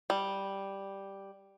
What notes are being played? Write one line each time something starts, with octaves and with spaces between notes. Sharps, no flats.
G3